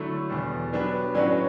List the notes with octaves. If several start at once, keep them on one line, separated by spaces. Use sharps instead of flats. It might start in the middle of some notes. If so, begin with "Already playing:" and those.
Already playing: D3 F#3 A3 E4 A4
E2 B2 G3
F#3 B3 D4 G4 B4
A2 F#3 C#4 F#4 B4 D5
C#5